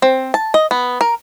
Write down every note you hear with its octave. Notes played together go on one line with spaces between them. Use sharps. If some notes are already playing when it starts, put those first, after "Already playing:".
C4
A5
D#5
B3
A#4